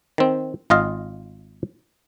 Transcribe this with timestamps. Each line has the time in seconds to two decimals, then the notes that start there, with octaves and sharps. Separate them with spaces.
0.18 D#3 C4
0.70 G#1 F4 D#5 F5